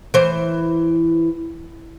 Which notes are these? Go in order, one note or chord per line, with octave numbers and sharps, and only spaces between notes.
E3 C5